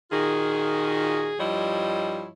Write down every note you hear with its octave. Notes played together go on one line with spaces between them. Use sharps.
A#2 D#3 F4 F#4 G#4
G2 F3 G3 E4 C#5 D#5